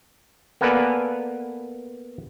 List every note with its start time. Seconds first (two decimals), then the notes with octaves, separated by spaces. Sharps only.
0.61 A#3 B3 A4 B4 D5 G#5